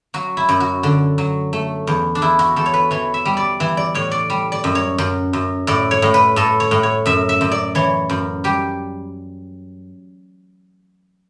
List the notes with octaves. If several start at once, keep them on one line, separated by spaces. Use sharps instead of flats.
F#3 F#4
E4
F#2
F#4
D3
F#3
A3
E2
D4
E2 E4
F#4
E2 A4
C#5
B4
E3 C#5
E5
G3
D5
E3
D5
A2 C#5
D5
G3
D5
F#2
C#5
F#2
F#2
A2 D5
C#5
A2
B4
A2 A4
C#5
A2
C#5
F#2 E5
E5
F#2
D5
E3 C#5
F#2
G3 G4